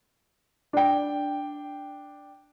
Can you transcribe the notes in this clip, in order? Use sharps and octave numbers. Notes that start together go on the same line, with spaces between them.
D4 G5